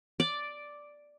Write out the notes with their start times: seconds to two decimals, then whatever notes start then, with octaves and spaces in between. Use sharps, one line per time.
0.20 D5